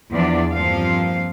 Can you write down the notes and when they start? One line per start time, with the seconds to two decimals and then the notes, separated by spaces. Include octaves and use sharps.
0.12 E2 F3 D4 D5
0.54 G2 F3 A#3 C4 F5